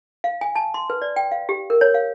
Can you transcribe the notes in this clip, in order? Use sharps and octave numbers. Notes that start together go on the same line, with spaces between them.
F5
G#5
A5
C6
B4
D5
G5
F5
G4
A#4
C#5
F5